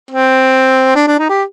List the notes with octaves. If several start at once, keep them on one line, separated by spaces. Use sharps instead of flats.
C4
D4
D4
D#4
G4